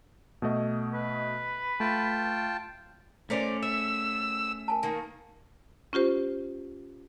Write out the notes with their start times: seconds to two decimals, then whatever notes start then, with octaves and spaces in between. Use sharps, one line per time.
0.42 B2 A3 D#5
0.93 B4
1.80 A3 F4 G5 A5
3.30 A3 C#4 A#4 C5 D5
3.63 E5 E6
4.68 A#4 G#5 A5
4.83 D#3 A#3
5.93 C#4 F4 G4 C5